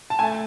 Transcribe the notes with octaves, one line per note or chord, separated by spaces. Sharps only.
A5
A3 G#5